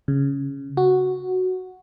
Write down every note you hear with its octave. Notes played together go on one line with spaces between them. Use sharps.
C#3
F#4